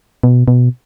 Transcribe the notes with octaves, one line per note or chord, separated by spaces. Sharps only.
B2
B2